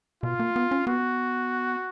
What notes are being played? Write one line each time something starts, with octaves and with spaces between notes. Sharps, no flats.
B2 F4
A#3
B3
C#4
B3 F#4